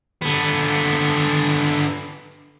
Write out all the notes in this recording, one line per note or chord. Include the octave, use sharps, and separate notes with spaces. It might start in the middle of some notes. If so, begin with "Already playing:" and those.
D3 B3